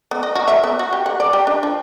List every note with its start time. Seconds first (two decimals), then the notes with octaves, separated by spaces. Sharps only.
0.11 B3
0.23 D#5
0.35 F#4
0.48 E5
0.64 B3
0.79 F#4
0.93 G4
1.06 F#5
1.20 D5
1.33 G4
1.47 D4
1.63 F3